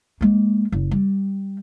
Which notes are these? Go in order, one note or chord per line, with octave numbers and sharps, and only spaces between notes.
G#3 A#3
F#1
G3